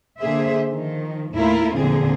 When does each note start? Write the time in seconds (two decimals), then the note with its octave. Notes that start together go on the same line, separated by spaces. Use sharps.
0.19 D3 A#3 G#4 C5 E5
0.72 D#3 F3
1.33 D#2 A2 A3 E4 F4 A#4
1.75 E2 A#2 D3 F3 C4 G#4